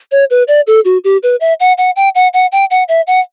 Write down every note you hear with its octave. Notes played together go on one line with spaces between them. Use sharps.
C#5
B4
D5
A4
F#4
G4
B4
E5
F#5
F#5
G5
F#5
F#5
G5
F#5
E5
F#5